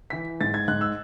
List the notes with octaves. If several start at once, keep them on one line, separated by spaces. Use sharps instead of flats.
E3 B6
G#2 A6
G#6
G#2 F#6
E6